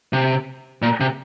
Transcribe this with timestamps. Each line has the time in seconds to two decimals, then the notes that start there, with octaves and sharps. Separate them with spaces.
0.13 C3
0.82 A#2
1.00 C3